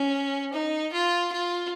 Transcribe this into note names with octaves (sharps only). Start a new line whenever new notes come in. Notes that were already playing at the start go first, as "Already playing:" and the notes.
Already playing: C#4
D#4
F4
F4